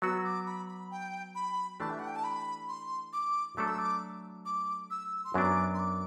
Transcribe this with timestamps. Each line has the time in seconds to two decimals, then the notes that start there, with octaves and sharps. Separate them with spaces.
0.02 F#3 B3 F#4 E6
0.24 D6
0.47 B5
0.68 B5
0.91 G5
1.35 B5
1.80 E3 A3 D4 G4 A5
1.90 E5
1.99 F#5
2.07 G5
2.16 A5
2.24 B5
2.69 C6
3.13 D6
3.57 F#3 A3 D4 A4 D6
3.68 E6
3.79 D6
4.45 D6
4.91 E6
5.25 C6
5.34 F#2 F#3 B3 D4 D6
5.74 C6
5.79 D6